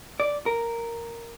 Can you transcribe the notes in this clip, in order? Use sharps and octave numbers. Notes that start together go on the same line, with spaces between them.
D5
A#4